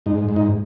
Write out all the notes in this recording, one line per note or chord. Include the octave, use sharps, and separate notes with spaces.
G#2 D#4
G#2
D#4